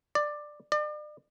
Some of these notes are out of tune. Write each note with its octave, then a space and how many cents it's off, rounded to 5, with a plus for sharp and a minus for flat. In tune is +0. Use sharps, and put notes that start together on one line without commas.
D5 +15
D5 +40